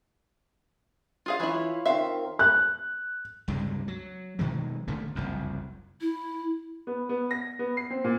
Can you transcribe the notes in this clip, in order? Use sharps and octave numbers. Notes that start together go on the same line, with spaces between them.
F4 G#4 F5
E3 E4 F4 C#5 F5
D#3 C4 E5 F5 C6
F#6
C#2 G2 C3 G#3
F#3
B2 D#3 F#3 G#3
A#2 D3 D#3 A3
F#1 C2 F2
E4
B3
B3
A#6
B3
C7
C4
A#2